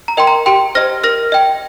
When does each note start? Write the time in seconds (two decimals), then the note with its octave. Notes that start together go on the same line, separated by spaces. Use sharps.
0.08 A#5
0.17 A#4 D#5 G5 C6
0.27 A#5
0.46 G4 G5 C6
0.75 C5 D#5 F6 A#6
1.04 A#4 F6 A#6
1.32 D#5 G5